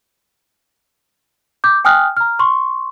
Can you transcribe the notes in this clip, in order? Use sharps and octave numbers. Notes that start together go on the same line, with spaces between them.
D6 G6
G5 G#5 D#6 F6 F#6
A#5 F6
C6 C#6